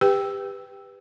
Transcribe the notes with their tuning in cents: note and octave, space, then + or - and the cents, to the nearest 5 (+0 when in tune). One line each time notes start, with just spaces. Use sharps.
G4 +25 B4 +0 G5 +0